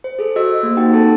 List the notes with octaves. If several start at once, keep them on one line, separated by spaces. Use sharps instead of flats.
C5
G#4 A4
F#4 D#5 E6
A#3 C5
D#4 G4 A#4 F#5 G5
C4 D#4 G4 A4 C5 A5